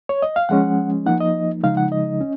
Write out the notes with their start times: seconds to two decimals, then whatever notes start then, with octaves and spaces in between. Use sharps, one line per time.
0.09 C#5
0.22 D#5
0.36 F5
0.49 F3 G#3 C#4 F#5
1.06 F3 A#3 D#4 F#5
1.20 D#5
1.63 C#3 F3 G#3 D#4 F5
1.77 F#5
1.92 D#5
2.21 C#4